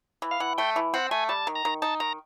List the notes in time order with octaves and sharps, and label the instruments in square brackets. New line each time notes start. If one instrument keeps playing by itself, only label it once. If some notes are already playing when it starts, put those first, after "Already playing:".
[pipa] E3
[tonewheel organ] F5
[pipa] E3 [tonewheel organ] F#5
[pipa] A3 [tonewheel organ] G5
[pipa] E3
[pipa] C4 [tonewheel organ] F#5
[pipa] A3 [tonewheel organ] G#5
[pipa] G3 [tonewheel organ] A5
[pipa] D#3
[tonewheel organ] A#5
[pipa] D#3
[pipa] D#4 [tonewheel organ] A5
[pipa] D#3 [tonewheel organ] A#5